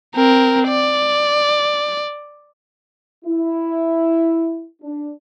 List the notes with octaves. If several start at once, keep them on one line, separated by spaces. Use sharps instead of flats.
C4 A#4
D5
E4
D4